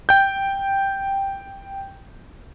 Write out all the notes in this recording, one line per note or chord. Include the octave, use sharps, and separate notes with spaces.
G5 G6